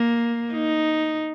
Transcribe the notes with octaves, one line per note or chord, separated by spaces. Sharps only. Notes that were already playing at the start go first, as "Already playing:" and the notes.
Already playing: A#3
D#4